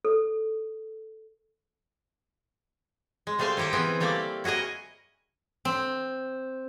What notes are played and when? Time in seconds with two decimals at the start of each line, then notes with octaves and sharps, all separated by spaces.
0.05 A4
3.27 G#3
3.39 G3 A3 G#4 C5 F5
3.57 D#3 E4 G4 A#4 G5
3.73 E3 B3 C4 G#4
4.00 G3 A3 A#3 G4 D5
4.44 E4 F#4 G#4 A#4 D#5
5.65 C4